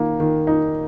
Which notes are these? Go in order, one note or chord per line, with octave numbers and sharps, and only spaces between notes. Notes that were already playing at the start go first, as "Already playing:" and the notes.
Already playing: D#3 A#3 D#4
D#3
D#4